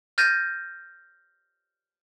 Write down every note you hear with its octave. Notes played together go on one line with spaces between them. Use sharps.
F6 G6 A6 A#6 D#7